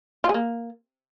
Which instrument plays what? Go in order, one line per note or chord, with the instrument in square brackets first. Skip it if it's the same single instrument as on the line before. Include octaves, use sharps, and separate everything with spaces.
[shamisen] F4
G#4
A#3